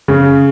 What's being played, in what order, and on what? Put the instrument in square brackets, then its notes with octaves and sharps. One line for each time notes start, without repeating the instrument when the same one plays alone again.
[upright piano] C#3